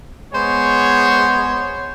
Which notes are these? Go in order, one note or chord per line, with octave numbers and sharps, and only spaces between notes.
G#3 B3 C5 C#5